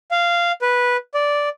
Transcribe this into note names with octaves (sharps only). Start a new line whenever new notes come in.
F5
B4
D5